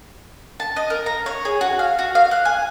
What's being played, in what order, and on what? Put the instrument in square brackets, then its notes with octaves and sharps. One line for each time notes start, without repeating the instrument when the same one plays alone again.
[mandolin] A5
D#5
A#4
A#5
C#5
G#4
F#4
F5
F#4
F5
F#6
G#5